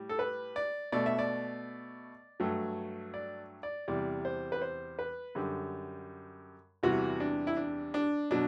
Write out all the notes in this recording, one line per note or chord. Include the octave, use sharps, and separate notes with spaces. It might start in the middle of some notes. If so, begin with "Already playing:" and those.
Already playing: A2 G3
A4
B4
D5
B2 A3 D5
E5
D5
G2 F#3 A3
D5
D5
E2 C3 G3 D5
C5
B4
C5
B4
F#2 D3 G3
E2 C3 E3 G3 F#4
D4
E4
D4
D4
B2 F#3 D4